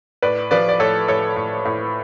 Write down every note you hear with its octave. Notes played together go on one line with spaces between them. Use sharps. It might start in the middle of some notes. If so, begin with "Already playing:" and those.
A2 B4 D5
F3 B4 D5
D5
A2 A4 C#5
A2 A4 C#5
A2
A2